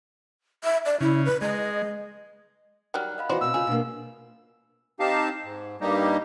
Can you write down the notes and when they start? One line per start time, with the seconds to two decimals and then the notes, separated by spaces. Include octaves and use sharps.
0.64 E5
0.86 D5
1.01 C#3 E4
1.25 B4
1.41 G#3 D#5
2.94 D#3 F#3 G3 F#5 F6 F#6
3.18 D#5 F5 B5
3.29 E3 B3 D#4 F#4 C5 D5
3.41 B2 C4 E6
3.54 C#3 F4 G#4
3.67 B2 A#3 D4 B4 F5
5.00 C4 D#4 G4 F5 A5
5.44 G#2
5.81 G2 G3 A#3 D#4 G4